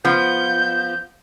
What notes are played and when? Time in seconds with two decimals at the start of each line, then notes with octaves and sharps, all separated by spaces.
0.04 F3 B3 G6